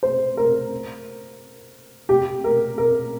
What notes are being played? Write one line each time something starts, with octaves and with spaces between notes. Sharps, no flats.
C5
A#4
G4
A#4
A#4